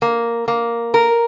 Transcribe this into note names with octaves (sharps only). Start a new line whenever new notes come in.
A#3
A#3
A#4